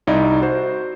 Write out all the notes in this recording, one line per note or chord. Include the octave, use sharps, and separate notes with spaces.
C2 D#4 E4 D5
F#4 C5